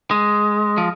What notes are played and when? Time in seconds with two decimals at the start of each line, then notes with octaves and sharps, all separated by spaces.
0.11 G#3
0.78 F3